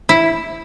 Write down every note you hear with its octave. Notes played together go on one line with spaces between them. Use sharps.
E4